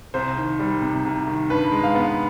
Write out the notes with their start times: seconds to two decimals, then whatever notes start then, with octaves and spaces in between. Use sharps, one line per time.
0.14 C2 C5
0.37 D#3
0.60 G3
0.82 C3
1.05 C2
1.27 D#3
1.50 G2 B4
1.72 G#3
1.83 F5
1.95 B3